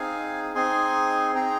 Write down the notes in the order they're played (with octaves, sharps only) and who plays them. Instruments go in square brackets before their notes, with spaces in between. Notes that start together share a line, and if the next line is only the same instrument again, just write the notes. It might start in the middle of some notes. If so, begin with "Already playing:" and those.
Already playing: [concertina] C4 D#4 G#4 F5 G#5
C4 D#4 G#4 G#5 C6
C4 D#4 G#4 G5 A#5